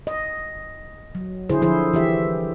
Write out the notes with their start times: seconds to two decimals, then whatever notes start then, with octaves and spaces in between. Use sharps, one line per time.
0.07 D#5
1.15 F#3
1.49 D3 E4 G#4 C5
1.62 D3 F3 E4 G#4 C5
1.93 E3 G4 E5